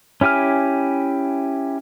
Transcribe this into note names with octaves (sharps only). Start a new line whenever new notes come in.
C#4 E4 G4 G#5 F6